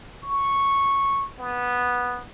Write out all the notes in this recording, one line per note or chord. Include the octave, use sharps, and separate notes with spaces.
C#6
B3